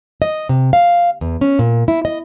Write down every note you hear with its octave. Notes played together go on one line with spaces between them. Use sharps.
D#5
C3
F5
E2
C#4
A#2
E4
D#5